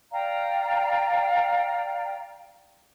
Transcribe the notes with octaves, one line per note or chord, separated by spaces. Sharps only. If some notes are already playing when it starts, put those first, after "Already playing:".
D5 F5 G5 A#5